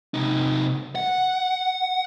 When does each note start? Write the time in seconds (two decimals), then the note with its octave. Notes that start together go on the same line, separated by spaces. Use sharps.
0.14 C3 D#4
0.96 F#5